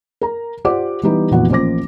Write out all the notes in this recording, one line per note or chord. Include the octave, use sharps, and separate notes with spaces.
A#4 A#5
F4 G4 C5 D5 F#5 D6
E3 G3 B3 D#4 G4 B4
F1 A#2 E3 B3 F#4 F#5
A1 F3 A#3 C5 D6 A#6